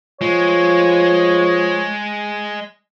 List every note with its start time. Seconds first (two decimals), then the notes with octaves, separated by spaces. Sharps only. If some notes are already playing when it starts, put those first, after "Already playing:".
0.21 F3 G#3 C#5